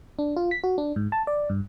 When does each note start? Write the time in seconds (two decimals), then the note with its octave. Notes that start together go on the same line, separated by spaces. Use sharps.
0.19 D4
0.36 F4
0.51 B6
0.64 F#4
0.78 D4
0.96 G#2
1.12 A5
1.27 D5
1.50 G2